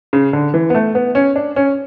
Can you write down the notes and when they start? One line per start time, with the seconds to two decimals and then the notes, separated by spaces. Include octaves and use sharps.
0.13 C#3
0.33 D3
0.54 E3
0.70 B3
0.75 A3
0.95 B3
1.15 C#4
1.36 D4
1.56 C#4